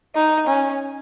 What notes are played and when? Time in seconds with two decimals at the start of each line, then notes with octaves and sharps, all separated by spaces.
0.15 D#4
0.47 C#4